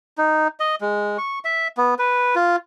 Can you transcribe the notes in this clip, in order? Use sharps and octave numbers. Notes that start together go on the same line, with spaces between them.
D#4
D#5
G#3
C#6
E5
B3
B4
F4